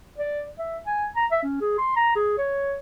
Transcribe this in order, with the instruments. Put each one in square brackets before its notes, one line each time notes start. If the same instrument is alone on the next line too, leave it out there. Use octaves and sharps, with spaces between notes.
[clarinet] D5
E5
G#5
A#5
E5
C#4
G#4
C6
A#5
G#4
C#5